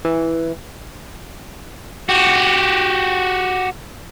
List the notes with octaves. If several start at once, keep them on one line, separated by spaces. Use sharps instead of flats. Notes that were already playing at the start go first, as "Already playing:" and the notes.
E3
F#4 G4